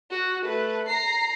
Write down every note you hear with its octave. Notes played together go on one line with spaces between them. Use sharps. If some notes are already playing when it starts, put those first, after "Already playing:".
F#4
A3 B4
A#5 C7